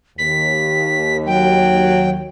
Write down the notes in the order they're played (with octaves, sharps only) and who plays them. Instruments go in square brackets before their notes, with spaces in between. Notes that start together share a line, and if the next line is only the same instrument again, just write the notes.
[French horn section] D#2 [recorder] B6
[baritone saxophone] F#3 [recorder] G5